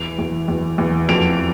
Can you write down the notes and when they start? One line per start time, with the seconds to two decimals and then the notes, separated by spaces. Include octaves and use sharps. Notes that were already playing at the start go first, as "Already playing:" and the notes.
Already playing: E2 E3 D7 F7
0.19 E2
0.48 E2
0.78 E2
1.09 F2 D7 F7